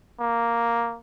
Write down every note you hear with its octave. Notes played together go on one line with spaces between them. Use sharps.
A#3